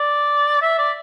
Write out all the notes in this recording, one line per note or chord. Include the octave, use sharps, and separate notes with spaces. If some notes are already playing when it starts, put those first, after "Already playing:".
Already playing: D5
E5
D5